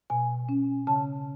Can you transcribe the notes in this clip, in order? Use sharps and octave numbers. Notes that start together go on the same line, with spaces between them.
B2 G#5
C#4
C#3 A5